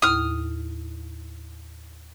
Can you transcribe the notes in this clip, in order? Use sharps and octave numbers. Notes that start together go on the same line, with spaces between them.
D#2 A2 E4 D#6 F6